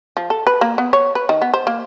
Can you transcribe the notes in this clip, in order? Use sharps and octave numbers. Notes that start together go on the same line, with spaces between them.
F3
A4
B4
A#3
B3
C#5
B4
D#3
B3
C5
A#3